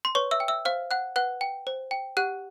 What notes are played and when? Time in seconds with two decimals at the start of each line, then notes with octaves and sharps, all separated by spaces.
0.05 C6
0.15 B4 C#5 C#6
0.31 E5 E6
0.40 G5
0.48 E5 E6
0.65 C5 F5 F6
0.91 F#5 F#6
1.16 B4 F#5 F#6
1.41 G5
1.67 C5
1.91 G5
2.17 G4 F#5 F#6